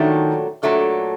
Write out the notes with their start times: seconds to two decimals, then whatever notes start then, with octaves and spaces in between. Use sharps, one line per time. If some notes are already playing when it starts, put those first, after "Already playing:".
Already playing: A#2 D#3 F#3 A3 D4
0.63 A#2 F#3 A3 D4